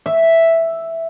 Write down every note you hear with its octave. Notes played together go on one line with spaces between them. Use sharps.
E5